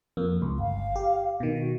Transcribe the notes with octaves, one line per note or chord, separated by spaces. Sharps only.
F2 A#3
C#2
G1 F5
G4
B2 D#3
F#4